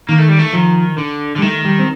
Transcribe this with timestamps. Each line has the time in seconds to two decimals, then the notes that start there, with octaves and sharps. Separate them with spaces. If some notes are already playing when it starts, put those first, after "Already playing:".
0.09 D#3 A#3
0.19 A3
0.29 G3
0.39 A3
0.53 D#3 F3
0.98 D3
1.36 D3
1.38 G3
1.42 D#3 A3
1.65 G3
1.79 C4